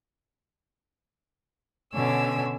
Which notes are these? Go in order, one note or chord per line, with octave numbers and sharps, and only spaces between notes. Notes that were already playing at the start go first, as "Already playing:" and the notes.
B2 D3 C#4 G#5 E6